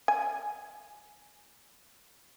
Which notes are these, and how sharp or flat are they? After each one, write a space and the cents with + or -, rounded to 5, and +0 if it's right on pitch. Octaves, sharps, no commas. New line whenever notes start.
G#5 +15